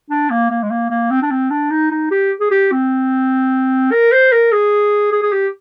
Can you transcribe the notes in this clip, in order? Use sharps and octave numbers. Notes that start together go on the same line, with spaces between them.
D4
A#3
A#3
G#3
A#3
A#3
C4
D4
C4
D4
D#4
D#4
G4
G#4
G4
C4
A#4
C5
A#4
G#4
G#4
G#4
G4